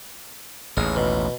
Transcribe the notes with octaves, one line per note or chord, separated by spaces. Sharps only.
A1 D#2 G#4
B2